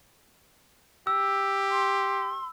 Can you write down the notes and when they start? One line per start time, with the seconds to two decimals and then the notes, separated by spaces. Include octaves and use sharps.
1.07 G4 E6
1.71 C6